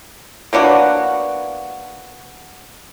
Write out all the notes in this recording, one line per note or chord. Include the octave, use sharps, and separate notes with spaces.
A#3 B3 D4 F#4